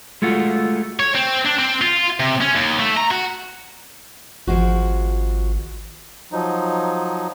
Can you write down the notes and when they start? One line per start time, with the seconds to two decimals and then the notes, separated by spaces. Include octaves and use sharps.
0.22 G#3 A3 F4 F#4
1.00 C#5
1.15 C4
1.46 D4
1.59 C4
1.82 F4
2.20 C3
2.41 C#4
2.56 D#2
2.79 A3
2.97 A#5
3.11 F#4
4.47 G#1 F3 G#3 F#4
6.32 F3 F#3 D#4